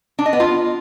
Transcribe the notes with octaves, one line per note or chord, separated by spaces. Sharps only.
D4
D#5
B3
F4